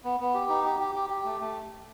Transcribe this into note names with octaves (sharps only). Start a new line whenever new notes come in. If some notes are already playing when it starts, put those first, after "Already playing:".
B3
B3
G4
D#4
G4
G4
G4
G4
A3
A3